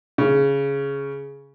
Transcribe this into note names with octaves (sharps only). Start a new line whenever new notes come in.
C#3